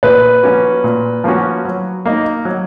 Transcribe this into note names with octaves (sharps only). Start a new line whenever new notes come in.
A#2 B4
F3 A#3 C#4 F#4
A#2
F3 A#3 C#4 F#4
F#3
A#3 D#4
F#3